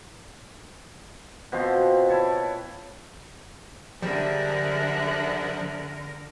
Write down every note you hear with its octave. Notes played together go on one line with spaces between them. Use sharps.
B2 F3 C4 C6
E4 C#5 A5
D3 F3 G3 G#4 A#4 E5 F#6